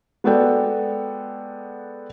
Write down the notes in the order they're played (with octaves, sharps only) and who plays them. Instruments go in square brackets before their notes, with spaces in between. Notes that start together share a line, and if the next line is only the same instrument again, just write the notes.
[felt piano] G#3 B3 F#4 A4 D5 G5